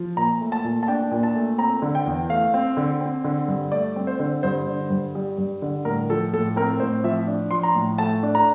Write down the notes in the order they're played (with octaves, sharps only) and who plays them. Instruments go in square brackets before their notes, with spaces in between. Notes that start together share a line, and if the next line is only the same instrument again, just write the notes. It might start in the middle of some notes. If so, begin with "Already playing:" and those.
Already playing: [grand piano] F3
A#2 A#5
A3
A5
A#2
A5
D4 G5
A#2
A5
A3
C4 A#5
D3
G5
E2
A3 F5
C4
D3
C4
D3
G2
A3 D5
C4
C5
D3
G2 C5
D3
G2
G3
G2
D3
A2 A#4
F3 A4
A2 A4
C4 A#4
A2 C5
F3 E5
D4
F3 C6
A#5
A2
A3 A5
D4
A#5